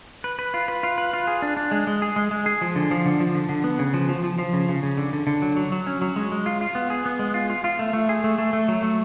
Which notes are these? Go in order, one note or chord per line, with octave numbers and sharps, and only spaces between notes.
B4
B4
F4
B4
F4
B4
F4
G#4
D4
D4
G#3
G#3
G#4
G#3
G#3
G#4
F3
D3
F3
D3
F3
D3
D3
B3
C#3
F3
F3
F3
F3
C#3
C#3
C#3
D3
D3
D3
F#3
F#3
F#3
C#4
F#3
G#3
G#3
F4
F4
B3
G#4
B3
G#3
F4
F4
F4
A3
A3
G#4
A3
A3
A3
F#3
A3